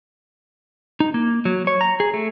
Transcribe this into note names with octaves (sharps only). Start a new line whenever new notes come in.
D#4
A#3
F#3
C#5
A#5
G#4
A3